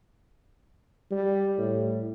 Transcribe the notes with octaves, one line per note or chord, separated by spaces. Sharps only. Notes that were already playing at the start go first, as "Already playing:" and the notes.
G3
A2